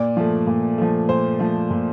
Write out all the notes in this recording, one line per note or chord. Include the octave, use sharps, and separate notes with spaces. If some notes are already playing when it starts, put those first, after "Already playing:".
Already playing: A#2 D5
F3 A3
A#2
F3 A3
A#2 C5
F3 A3
A#2